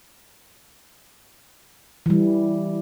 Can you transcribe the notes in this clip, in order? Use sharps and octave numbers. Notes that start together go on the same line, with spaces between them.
E3 G3